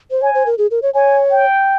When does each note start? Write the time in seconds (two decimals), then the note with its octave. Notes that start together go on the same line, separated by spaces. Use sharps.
0.11 C5
0.22 C#5 G#5
0.35 C5
0.46 A#4
0.58 G#4
0.71 A#4
0.82 C#5
0.94 C#5 G#5
1.31 G5